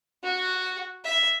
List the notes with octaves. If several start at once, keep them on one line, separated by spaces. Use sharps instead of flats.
F#4
E5